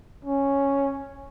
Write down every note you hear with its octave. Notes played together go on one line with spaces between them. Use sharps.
C#4